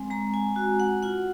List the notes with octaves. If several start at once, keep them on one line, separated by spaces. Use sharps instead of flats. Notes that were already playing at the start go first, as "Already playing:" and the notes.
Already playing: G#3 C4 G#5
G#3 A#5
G#5
F#4
F#5
F4 F#5